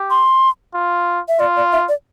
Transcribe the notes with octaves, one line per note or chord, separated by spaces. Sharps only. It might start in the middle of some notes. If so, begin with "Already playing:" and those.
Already playing: G4
C6
F4
E5
F4 D5
D5
E5
D5